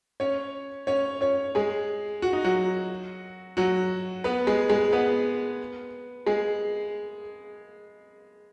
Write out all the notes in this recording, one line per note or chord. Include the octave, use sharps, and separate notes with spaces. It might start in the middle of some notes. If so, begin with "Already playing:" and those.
C#4 C#5
C#4 C#5
C#4 C#5
G#3 G#4
F#4
D#4
F#3 F#4
F#3 F#4
B3 B4
G#3 G#4
G#3 G#4
B3 B4
G#3 G#4